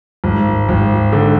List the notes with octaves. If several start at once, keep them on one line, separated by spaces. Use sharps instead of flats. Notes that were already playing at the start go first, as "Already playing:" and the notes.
G#1
G#1
D3